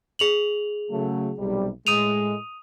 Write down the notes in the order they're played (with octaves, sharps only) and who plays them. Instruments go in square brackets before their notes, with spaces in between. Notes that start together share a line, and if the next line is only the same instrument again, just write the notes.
[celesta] G#4 F7 F#7
[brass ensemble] C#3 F#3 A3
B1 C3 G3
[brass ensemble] A2 G#3 [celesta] D#6 D#7 F7